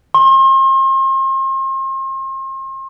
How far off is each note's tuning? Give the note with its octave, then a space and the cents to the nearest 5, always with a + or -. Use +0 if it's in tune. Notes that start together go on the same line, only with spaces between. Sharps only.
C6 +40